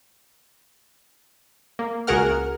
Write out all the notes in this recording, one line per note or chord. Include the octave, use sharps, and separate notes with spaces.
A#3
C#2 F#4 G#4 A#4 F#5 F6